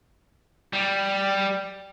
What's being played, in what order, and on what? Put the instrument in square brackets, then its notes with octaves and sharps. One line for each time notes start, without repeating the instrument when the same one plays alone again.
[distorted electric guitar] G3